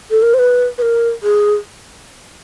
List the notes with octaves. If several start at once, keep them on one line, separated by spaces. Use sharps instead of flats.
A4
A#4
C5
B4
B4
A#4
G#4